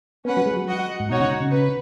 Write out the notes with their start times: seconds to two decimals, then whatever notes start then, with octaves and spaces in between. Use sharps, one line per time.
0.25 B3 C#4 B4 F#5
0.37 F#3
0.46 G#3
0.57 F#3
0.68 F#4 D#5 F#5
1.00 G#2
1.10 B2 D#4 F#4 C#5 F#5
1.20 C#3
1.41 C#3
1.51 B4